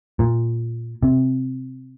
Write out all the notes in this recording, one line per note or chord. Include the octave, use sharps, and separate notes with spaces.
A#2
C3